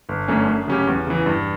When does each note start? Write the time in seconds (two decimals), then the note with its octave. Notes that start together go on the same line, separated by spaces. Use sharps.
0.09 G1
0.28 F#2 D3 A3 C#4
0.48 F#2
0.68 C#3 F#3 C#4 G4
0.87 E2
1.07 C#3 E3
1.26 G2